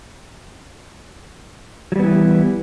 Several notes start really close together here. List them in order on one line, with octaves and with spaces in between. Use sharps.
F#3 G3 B3 E3